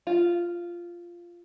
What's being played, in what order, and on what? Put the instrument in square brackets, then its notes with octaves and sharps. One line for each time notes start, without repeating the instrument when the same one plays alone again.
[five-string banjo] F4